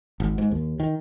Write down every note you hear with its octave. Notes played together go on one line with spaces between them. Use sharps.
G#1
G#2
D#2
D#3